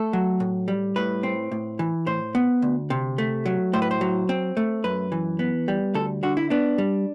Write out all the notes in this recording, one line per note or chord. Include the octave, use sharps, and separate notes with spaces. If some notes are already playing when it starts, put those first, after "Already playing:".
Already playing: A3 A4
F#3
A2
G3
A2 B4
C4
A2
E3
A2 C5
B3
D2
C3
A3
F#3
A2 C5
B4
C5
F#3
C4
A3
F#2 B4
E3
B3
G3
D2 A4
D3 F#4
E4
B3 D4
G3